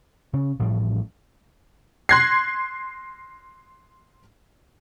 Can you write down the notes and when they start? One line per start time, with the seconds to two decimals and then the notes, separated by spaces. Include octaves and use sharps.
0.33 C#3 C#4
0.59 A1 A2 F3 G3
2.09 C6 F#6 G#6 A#6 C7